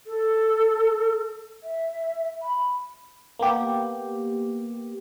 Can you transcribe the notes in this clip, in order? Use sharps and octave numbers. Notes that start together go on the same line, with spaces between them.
A4
E5
B5
A#3 B3 G4